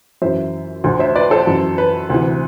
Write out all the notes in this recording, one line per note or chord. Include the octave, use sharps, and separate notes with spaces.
F#2 E3 C5 E5
D2 D3
C5 E5
B4 D5
A4 C5
F#2 E3
B4
D2 C3 E3